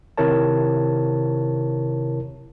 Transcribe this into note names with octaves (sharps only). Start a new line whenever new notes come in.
C3 D#3 E4 A#4 C#5 A5